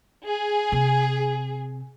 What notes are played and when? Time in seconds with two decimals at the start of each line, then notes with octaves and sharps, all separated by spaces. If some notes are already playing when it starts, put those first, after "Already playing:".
0.25 G#4
0.72 C3